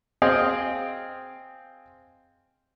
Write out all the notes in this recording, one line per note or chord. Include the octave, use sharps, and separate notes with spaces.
C4 G#4 D#5 F5 G5